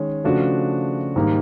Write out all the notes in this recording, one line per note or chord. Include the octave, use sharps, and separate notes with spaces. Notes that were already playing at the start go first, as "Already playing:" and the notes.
Already playing: D#3 G#3 C#4
C#3 F3 A3 D4 F#4
G#2 D#3 G3 A#3 D#4